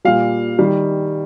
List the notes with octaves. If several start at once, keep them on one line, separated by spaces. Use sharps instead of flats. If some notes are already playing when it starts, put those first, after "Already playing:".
A#2 G3 F5
D#3 G3